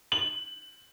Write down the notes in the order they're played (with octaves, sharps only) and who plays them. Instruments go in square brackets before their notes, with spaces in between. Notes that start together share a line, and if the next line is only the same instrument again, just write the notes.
[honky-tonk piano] F#7